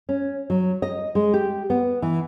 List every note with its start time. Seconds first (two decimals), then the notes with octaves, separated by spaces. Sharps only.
0.09 C#4
0.50 F#3
0.82 D#5
1.15 G#3
1.34 G4
1.70 B3
2.02 E3